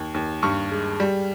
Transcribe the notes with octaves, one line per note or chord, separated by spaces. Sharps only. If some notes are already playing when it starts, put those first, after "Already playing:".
Already playing: D#2
D#2
G2 C#6
G#3
G3